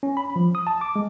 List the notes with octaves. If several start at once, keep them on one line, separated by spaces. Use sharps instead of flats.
C#4
B5
F3
D#6
A5
D6
G#3